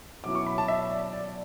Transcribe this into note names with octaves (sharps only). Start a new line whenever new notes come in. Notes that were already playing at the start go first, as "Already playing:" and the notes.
B2 F#3 C#4 E4 D6
C#6
B5
A5
E5
D5
D5